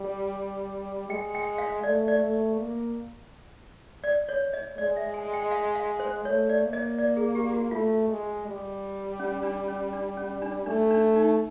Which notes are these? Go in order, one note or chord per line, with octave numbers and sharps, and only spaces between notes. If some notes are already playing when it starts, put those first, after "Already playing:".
Already playing: G3
G#3 G5
G5
F5
A3 D5
D5
A3
A#3
D5
C#5
D#5
G#3 D5
E5
G#5
G5
F5
F5
C5
A3 C#5
D5
A#3
D#5
D5
G#4
G4
F#4
A3 F4
G#3
G3
C#4
D4
C#4
D4
C#4
D4
A3 D4
D4
D#4